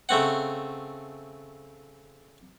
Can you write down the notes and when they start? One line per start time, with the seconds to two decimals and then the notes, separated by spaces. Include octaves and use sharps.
0.09 C#3 A3 C4 F#5